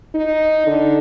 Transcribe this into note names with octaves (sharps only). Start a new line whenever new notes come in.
D#4
D3